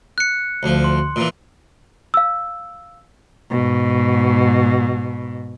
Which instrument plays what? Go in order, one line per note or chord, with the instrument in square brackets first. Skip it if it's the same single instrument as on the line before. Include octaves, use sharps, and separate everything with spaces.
[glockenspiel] F#6 C#7
[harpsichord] D2 F3
[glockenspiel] C6
[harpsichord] A#2 E3
[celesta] F5 E6
[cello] G#2 B2